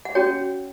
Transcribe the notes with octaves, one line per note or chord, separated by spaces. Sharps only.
F#5
C#4 F#4 C#5 G5